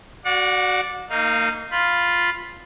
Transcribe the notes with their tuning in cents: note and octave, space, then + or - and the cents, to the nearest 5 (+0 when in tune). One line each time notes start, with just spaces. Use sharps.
F#4 +10 D5 +0 F#5 -35
A#3 -30 D#4 +0 F5 +0
F4 +0 B5 +0